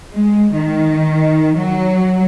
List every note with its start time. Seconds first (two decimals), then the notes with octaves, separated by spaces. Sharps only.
0.13 G#3
0.53 D#3
1.57 F#3